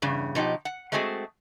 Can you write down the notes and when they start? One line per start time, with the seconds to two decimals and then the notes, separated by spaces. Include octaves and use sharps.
0.02 E2 G2 C#3
0.35 B2 F3 D#4 G4
0.65 F#5
0.92 G#3 A3 C4 F#4 G#4